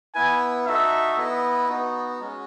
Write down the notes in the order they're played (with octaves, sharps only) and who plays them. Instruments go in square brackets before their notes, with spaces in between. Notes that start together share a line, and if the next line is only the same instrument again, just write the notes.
[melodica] B3 E4 B4 [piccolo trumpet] G#5
[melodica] D#4 F#4 A4 [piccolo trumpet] E5
[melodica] B3 E4 B4 D#5
B3 D#4 F#4
G#3 C#4 F#4